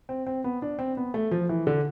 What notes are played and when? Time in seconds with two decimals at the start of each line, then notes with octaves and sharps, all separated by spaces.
0.09 C4
0.27 C4
0.44 B3
0.62 D4
0.79 C4
0.97 B3
1.14 A3
1.31 F3
1.49 E3
1.67 D3